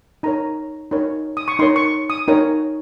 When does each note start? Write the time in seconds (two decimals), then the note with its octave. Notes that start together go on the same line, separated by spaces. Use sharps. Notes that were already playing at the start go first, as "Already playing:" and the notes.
0.23 D#4 A#4 C#5 A#5
0.91 D#4 A#4 C#5
1.37 D#6
1.48 C#6
1.59 D#4 A#4 C#5 C6
1.76 C#6
2.10 D#6
2.28 D#4 A#4 C#5